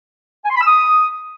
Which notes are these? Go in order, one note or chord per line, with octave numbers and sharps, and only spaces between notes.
G#5
C6
B5
E6
D#6